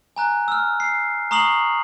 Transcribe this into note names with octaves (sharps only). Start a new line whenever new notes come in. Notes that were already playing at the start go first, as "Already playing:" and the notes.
G#5 A#5 F#6
E6 F6
C7
A#5 C#6 D#6 C7 F7 F#7